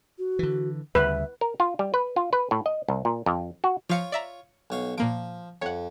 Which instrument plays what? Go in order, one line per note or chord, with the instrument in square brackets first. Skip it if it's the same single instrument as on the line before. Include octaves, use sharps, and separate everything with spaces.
[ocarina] F#4
[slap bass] D3 E3
[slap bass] D2 C#3 G3 [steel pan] B4 [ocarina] E5
[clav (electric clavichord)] A#4
F4
G3
B4
F4
B4
A2
D#5
C2
A#2
F2
F#4
[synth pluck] F3 F5 C#7 [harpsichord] F4 C#5
[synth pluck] D5 E5 A#5
[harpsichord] B1 C#5 F5
[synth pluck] A#2 A#3 D7 [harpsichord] F3
[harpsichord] F2 [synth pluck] C#5 F#5